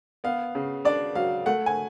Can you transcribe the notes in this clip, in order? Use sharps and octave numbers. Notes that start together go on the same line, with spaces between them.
B3 F5
C#3
D4 D5
F#3 F5
A3 F#5
G#5